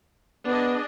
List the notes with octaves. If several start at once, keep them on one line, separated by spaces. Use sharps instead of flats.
B3 D4 G#4 D#5